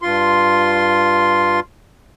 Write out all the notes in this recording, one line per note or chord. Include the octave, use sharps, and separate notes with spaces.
G2 F4 C6